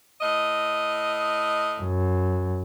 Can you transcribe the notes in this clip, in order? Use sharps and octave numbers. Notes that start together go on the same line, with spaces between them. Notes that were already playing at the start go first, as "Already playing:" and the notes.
A2 D#5
F#2